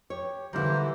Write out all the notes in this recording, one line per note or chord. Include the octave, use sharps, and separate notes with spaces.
G4 C#5
D3 E3 F#3 G3 A#3 E4 C5 A#5